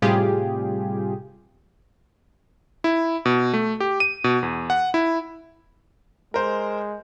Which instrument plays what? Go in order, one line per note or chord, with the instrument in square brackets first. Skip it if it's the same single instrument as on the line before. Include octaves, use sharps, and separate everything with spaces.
[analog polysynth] A2 C3 G3 F4 G4 G#4
[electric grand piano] E4
B2
A3
G4
D#7
B2
E2
F#5
E4
[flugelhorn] G#3 [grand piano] A#4 C5